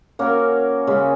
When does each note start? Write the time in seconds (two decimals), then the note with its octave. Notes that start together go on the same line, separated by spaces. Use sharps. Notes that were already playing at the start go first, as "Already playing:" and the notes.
0.19 A#3 C#4 F#4 A#4
0.87 C#3 G#3 C#4